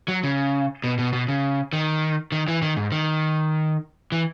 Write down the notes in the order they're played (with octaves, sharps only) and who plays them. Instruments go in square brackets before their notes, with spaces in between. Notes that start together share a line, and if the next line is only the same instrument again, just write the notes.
[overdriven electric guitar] F#3
C#3
B2
B2
B2
C#3
D#3
D#3
E3
D#3
G#2
D#3
E3